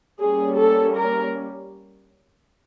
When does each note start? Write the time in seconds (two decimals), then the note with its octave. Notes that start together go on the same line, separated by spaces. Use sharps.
0.21 G3 A#3 C#4 G#4
0.59 A4
0.96 A#4